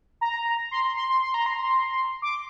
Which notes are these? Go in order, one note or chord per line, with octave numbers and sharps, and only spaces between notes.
A#5
C6
C6
C6
C6
C6
A#5
C6
D6